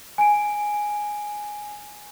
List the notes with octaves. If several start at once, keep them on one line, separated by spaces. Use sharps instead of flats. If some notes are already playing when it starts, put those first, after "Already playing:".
G#5 D7